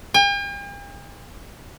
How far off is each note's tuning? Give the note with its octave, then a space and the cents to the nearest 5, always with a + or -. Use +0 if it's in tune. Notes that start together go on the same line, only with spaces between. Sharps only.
G5 +45